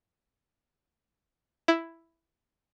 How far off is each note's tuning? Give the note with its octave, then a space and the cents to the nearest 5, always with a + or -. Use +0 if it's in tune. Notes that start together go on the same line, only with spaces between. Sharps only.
E4 +5